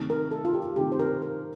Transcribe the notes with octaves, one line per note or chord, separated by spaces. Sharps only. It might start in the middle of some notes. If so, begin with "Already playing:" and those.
Already playing: C3 D#3 A3 C4 D#4
A#4
A4
F4
G4
C3 D#3 A3 C4 D#4 G4
C5
A#4
A#4